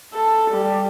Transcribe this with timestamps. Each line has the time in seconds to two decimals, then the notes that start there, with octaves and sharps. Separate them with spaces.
0.14 A4
0.51 G3